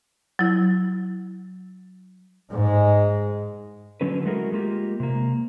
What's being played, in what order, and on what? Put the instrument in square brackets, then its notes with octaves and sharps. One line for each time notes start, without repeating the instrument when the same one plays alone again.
[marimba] F#3 E4
[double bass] G#2 G#3
[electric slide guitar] D3 F#3 C#4 B4
G#3 A3 E4 F#4 G#4 A#4
G#3 A#3 F4 G4
C3 A#3